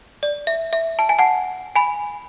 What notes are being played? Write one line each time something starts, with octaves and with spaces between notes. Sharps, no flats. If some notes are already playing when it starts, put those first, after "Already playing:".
D5
E5
E5
A5
G#5
F#5 A5
G#5 B5